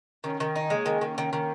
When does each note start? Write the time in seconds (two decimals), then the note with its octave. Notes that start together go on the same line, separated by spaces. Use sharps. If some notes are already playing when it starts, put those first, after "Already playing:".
0.24 D#3 C#4
0.40 D#3
0.56 D#4
0.70 G#3 A#3
0.86 D#3
1.01 D#3
1.18 D#3
1.33 D#3